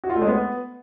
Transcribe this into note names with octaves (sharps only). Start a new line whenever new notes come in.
F#4
F4
A3
G#3
B3